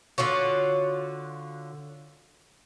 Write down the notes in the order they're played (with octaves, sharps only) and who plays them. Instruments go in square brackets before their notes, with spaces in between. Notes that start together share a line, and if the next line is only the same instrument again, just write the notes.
[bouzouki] D3 F4 F#4 C#5